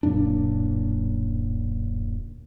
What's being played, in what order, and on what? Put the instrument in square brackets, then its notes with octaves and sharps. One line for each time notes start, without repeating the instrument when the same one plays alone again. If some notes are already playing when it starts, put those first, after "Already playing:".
[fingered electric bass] D1 F#2 A#2 D4